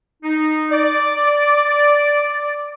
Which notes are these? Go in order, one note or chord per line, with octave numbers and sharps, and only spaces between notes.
D#4
D5